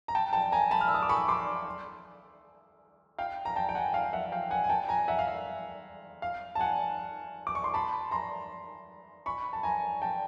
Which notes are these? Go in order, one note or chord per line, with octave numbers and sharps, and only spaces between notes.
A#5
G5 A5
G5 A5
G#5 A#5
A5 B5
F6
E6
D#6
D6
B5 C#6
C6 D6
F5 G5
A#5
G5 A5
G5
F#5 G#5
F5
E5 F#5
F5 G5
F#5 G#5
G#5
G5 A5
G#5 A#5
E5 F#5
F5
E5
F5
A5
F#5 G#5
D6
C#6
C6
A5 B5
A#5 C6
B5 C#6
A5
G#5 A#5
G5 A5